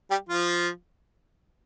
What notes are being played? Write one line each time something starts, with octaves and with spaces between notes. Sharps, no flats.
G3 G4
F3 F4